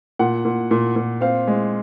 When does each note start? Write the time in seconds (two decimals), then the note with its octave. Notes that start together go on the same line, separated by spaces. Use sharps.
0.19 A#2 F#5
0.45 A#2
0.71 A#2
0.96 A#2
1.21 C4 F5
1.47 G#3